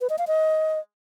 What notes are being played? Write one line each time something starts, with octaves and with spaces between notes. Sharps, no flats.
B4
D#5
F5
D#5